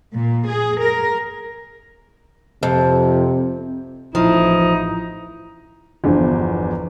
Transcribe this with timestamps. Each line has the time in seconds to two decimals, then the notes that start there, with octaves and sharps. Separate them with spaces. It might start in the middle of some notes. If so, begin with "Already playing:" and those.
0.12 A#2
0.46 G#4
0.81 A#4
2.63 F2 C3
4.15 A1 F3 D#4 E4
6.04 G1 E2 D3 F3